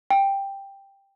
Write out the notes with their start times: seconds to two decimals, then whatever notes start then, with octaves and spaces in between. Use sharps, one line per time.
0.10 G5